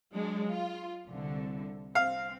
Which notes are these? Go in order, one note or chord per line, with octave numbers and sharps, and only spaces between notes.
F#3 G#3 D4
F4
C2 D3
C4 F5